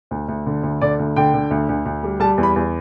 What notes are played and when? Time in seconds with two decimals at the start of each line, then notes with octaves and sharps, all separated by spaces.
0.11 D2
0.28 D2
0.46 D3
0.63 D2
0.81 D3 D5
0.99 D2
1.16 D3 G5
1.34 D3
1.51 D2
1.69 D2
1.85 D2
2.03 G3
2.20 G3 A5
2.38 E2
2.43 B5
2.56 E2